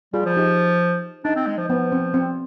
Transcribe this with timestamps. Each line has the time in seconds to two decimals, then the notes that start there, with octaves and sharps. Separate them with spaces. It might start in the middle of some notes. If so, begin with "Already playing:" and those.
0.13 G3 F4 G#4
0.25 F3
0.36 D#4 G4
1.24 D4 D#4
1.36 C4
1.47 G#3
1.58 F3
1.69 F3 B3
1.92 C4
2.14 C4